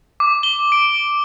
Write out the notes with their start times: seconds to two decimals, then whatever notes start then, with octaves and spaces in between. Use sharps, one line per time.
0.20 D6
0.43 G7
0.72 D7